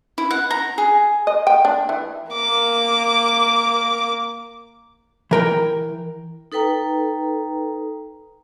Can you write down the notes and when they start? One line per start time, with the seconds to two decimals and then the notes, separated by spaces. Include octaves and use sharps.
0.18 E4
0.31 F#5
0.51 A#5
0.78 G#4
1.27 D#5
1.47 G5
1.65 D4
1.89 E3
2.32 A#3 D6
5.31 E3 A#4 G5
6.52 D#4 A4 B4 G5 A#5